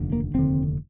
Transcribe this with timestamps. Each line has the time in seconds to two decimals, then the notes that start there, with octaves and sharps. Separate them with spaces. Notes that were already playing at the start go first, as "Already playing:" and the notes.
Already playing: F1 D#2 D3
0.12 A#3
0.34 F1 D#2 D3 C4